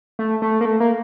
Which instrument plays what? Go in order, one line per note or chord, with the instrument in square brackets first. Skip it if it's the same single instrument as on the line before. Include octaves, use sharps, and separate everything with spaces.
[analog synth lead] A3
A3
A#3
A3
A#3